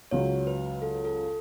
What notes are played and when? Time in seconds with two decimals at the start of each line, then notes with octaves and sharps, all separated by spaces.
0.11 C#2 C#3 F#3 C#5
0.47 B4
0.82 A4
1.05 A4